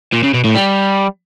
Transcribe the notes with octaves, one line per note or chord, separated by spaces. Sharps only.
A#2
C#3
B2
A2
G3